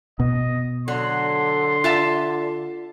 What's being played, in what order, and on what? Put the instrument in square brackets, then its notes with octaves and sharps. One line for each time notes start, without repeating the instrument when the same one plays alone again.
[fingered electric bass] B2 [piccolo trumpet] D#5
[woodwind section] D3 [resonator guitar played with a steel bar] F#3 [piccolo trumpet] C6
[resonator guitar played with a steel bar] F4 E5 A5